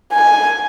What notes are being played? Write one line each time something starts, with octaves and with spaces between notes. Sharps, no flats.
G#5